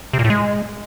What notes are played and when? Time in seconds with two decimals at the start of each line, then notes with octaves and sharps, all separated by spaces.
0.13 C3
0.19 A#2
0.24 A2
0.30 G#3